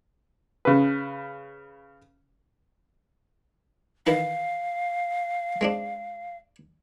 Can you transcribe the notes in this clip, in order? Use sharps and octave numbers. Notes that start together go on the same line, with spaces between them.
C#3 B4
D#3 E3 E4 F5
G#3 C4 D4